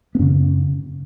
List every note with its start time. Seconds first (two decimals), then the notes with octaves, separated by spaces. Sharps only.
0.15 B3
0.19 F#2 C#3 C#4